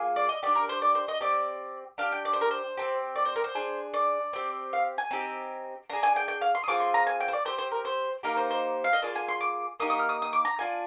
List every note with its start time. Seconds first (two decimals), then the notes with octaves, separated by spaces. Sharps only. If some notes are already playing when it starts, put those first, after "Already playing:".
Already playing: A#3 F4 G#4
0.16 D5
0.29 D#5
0.43 D4 G4 D5
0.55 A#4
0.69 C5
0.82 D5
0.95 C5
1.08 D#5
1.21 C4 G4 D5
1.98 D4 G4 F5
2.12 G5
2.25 D5
2.33 C5
2.41 A#4
2.51 C5
2.77 C4 G4
3.16 D5
3.25 C5
3.36 A#4
3.44 C5
3.55 D4 G#4
3.94 D5
4.33 C4 G4
4.73 F5
4.98 G#5
5.11 C4 D#4 G4
5.90 D4 G#4 A#5
6.03 G#5
6.16 G5
6.28 G5
6.41 F5
6.55 C6
6.64 D#6
6.68 C4 F4 G#4 D6
6.80 C6
6.94 A#5
7.07 G#5
7.20 G5
7.28 C5
7.33 D5
7.45 C4 G4 C5
7.58 C5
7.72 A#4
7.85 C5
8.23 A#3 D#4 G4 A#4
8.37 C5
8.50 C5
8.84 F5
8.93 D#5
9.02 A#3 F4 G#4 D5
9.16 G#5
9.28 C6
9.41 D6
9.80 A#3 D#4 G4 D#6
9.90 D#6
9.99 F6
10.09 D#6
10.22 D#6
10.33 D6
10.45 A#5
10.58 D4 F4 G#4 G#5